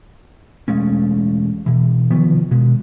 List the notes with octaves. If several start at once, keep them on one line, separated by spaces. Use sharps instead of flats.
E1 G#3 A3 C#4
B2 E3
C3 D#3 F3 B3
B2 G#3